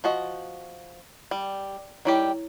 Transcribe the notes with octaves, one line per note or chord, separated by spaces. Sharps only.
F3 F#4 D#5
G3
D#3 G3 E4 G4 C#5 A#5